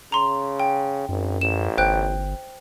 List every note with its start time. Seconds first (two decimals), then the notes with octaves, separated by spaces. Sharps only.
0.12 C#3 A#5 C6
0.60 G5
1.09 G#1 F#2
1.41 A1 E7
1.78 G1 C5 G5 F#6